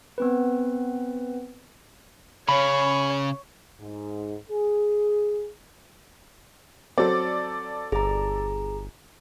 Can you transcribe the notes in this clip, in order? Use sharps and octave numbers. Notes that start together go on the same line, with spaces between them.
B3 C4 B4
C#3 C#5 B5
G#2
G#4
F#3 C4 A4 D5
G1 G#4 A#5